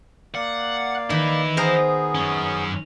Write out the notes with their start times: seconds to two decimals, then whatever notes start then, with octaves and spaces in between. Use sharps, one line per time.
0.35 A#3 D5 F5 F#5
1.10 D#3 E4 B4
1.57 B3 G#4 A#4 C5 A#5
2.15 F#2 C#4